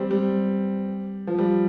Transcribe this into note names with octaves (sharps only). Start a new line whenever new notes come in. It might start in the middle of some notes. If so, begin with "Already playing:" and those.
Already playing: G3 C4
G3
F3
G3